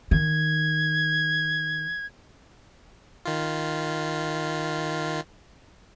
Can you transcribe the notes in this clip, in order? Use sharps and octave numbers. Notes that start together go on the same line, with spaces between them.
D#3 G#6
D#3 F4